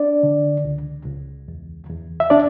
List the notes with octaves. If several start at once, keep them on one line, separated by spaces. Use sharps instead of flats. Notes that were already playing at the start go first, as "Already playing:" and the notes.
Already playing: D4 D5
D3
C#2
C#2
E2
E2
E5
D4 D5